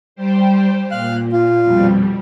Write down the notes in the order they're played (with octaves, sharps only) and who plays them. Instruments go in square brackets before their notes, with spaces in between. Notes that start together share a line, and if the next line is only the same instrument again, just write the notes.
[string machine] G3 G4 C5
[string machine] A#2 [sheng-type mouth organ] F5 F#6
[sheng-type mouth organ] F4
[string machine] F2 B2 G3